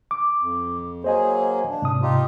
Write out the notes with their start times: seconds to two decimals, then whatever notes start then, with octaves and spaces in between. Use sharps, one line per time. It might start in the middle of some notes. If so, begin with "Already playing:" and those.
0.11 D6
0.41 F2
1.04 F#3 A#3 G#4 C5 D#5 G#5
1.69 D4
1.82 G#2 C3 D#6
2.02 D#4 F4 G4